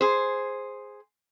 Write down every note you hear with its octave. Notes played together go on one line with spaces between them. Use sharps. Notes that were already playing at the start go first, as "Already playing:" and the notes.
G#4 C5